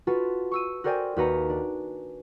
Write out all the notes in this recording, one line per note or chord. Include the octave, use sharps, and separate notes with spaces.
F4 F#4 B4 A5
C#6 E6 D#7
F#4 A#4 C5 D5 G5 G#5
D#2 F#4 B4 A#5 C#7
D4